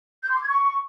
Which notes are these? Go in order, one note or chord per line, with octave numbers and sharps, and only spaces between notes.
G6
C6
D6
G#6
C#6